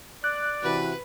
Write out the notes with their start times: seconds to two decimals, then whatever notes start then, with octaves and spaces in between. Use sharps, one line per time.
0.24 D5 F#6
0.63 C3 E3 F#4 B4